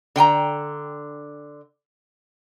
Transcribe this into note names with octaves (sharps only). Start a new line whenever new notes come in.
D3 G5 G#5 A#5